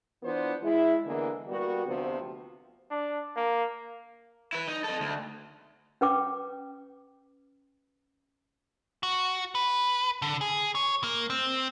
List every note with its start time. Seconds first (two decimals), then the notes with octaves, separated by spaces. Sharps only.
0.23 E3 B3 D4 F4 C5
0.63 G#3 E4
1.05 D3 E3 G#3 A#3 B3
1.48 G3 A#3 B3 F#4
1.86 D2 C3 F3 B3
2.91 D4
3.36 A#3
4.53 E4 B4
4.68 D#4
4.84 A4 D#5
5.00 D2
6.01 C#4 B4 G5 D6
9.03 F#4
9.55 B4
10.22 D3
10.41 G#4
10.75 C#5
11.04 A#3
11.30 C4